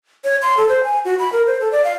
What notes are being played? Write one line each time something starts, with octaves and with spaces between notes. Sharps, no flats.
C#5
C6
A4
C5
G#5
F#4
B5
A#4
C5
A4
D5
F5